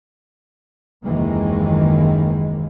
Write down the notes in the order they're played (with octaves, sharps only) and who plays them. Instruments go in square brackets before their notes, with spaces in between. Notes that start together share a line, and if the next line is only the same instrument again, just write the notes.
[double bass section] F#1 D#2 D#3 E3 G#3 A#3